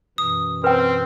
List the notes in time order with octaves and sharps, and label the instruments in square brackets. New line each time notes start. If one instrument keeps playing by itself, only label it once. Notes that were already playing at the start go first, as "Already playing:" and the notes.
[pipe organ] F#2 B2 E3 [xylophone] D#6
[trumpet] C4 [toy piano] B4 G5